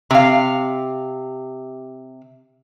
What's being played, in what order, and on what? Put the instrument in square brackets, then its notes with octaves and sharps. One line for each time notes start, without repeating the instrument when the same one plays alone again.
[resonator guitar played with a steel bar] C3 F5